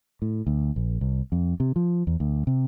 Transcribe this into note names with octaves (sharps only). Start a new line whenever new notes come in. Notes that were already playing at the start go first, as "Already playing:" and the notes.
A2
D2
A#1
C2
F2
C3
F3
E2
D2
C3